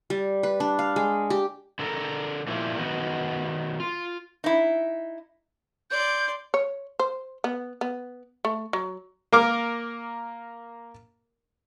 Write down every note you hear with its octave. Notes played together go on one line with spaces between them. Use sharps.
G3
B4
D4
F5
G#3
G4
D3 A4 A#4
A#2 F3 G3 A#3 E4
D#3 B3 F#4
F4
D#4 E4
D5 C6 G6
C#5
C5
B3
B3
A3
F#3
A#3 A#4 D6 F6